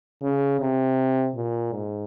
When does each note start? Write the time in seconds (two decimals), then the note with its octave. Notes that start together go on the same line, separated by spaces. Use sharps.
0.22 C#3
0.60 C3
1.35 A#2
1.72 G#2